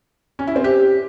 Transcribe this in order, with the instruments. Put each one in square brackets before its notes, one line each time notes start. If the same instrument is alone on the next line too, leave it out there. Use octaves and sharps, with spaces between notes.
[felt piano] C#4
E4
C4
G4